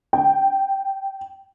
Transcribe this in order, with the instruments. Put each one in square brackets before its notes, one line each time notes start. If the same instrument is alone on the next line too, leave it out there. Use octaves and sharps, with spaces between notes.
[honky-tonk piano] G5